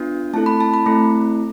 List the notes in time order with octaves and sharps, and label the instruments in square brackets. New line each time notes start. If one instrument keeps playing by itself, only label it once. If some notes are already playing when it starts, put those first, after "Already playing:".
Already playing: [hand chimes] B3 D4 F4
A3 C4 E4 A4 A5
B5
A5
B5
A3 C4 E4 A4